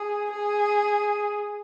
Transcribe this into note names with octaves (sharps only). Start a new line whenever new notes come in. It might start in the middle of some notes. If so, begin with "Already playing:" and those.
Already playing: G#4
G#4